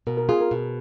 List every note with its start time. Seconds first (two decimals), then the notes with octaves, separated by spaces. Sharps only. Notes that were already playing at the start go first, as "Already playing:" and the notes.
0.07 B2 A#4
0.17 A#4
0.29 F4 G#4
0.41 A#4
0.51 B2